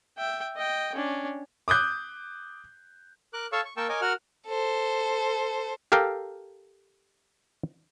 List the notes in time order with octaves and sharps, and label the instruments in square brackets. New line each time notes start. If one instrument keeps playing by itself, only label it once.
[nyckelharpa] E5 G5
D#5 G5
C#4 D4
[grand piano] D6 D#6 F#6 G6
[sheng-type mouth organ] A#4 D6 F#6
A4 C#5 F5 A5 C#6 E6
C#6
A#3 A#4 G5 A5 C#6 E6
A#4 C#5 D#5 G#5 D6
F#4 A#4 F#5 F6
[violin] A4 C5
[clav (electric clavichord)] G4 A4 A#4 F5 G5